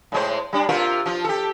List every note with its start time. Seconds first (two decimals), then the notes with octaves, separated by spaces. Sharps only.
0.12 A2 G#3 C5
0.53 G3 D4
0.69 C3 F4 A#4
1.06 F3 F4
1.24 G4 A4